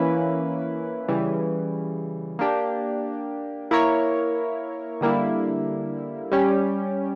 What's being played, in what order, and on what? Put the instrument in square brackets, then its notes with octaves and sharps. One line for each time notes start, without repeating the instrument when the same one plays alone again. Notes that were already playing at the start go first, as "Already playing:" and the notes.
Already playing: [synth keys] E3 A#3 C#4 E4 B4
C#3 E3 G3
A#3 D4 G4
A#3 E4 A#4 C#5
D3 G3 A#3 E4
G3 C#4 G4